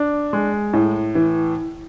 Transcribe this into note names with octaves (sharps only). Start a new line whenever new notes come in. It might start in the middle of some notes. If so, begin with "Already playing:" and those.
Already playing: D4
G#3
A2
E3